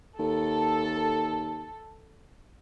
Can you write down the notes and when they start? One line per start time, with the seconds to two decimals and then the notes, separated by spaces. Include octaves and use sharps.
0.19 D#2 A4